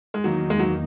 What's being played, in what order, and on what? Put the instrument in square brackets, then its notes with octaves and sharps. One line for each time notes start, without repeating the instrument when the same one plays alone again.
[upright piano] G#3
[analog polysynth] E2 D#3 A#3 D#4 [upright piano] F#3
[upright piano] G#3
F#3